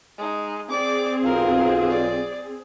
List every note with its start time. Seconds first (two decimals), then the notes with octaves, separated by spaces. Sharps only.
0.18 G#3 D#4
0.71 C4 G#4 D5 D6
1.25 B1 F4 A#4
1.90 D5